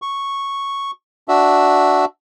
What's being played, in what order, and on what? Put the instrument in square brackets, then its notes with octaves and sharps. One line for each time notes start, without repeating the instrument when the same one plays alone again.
[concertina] C#6
D4 F#4 E5